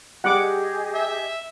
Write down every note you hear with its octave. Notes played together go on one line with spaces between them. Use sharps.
G3 G4 G#4 D#5 F#5 D6
E5